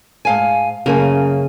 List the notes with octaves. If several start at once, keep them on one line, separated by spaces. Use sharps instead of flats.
G#2 F5 G#5
F#2 C#3 A#3 G#5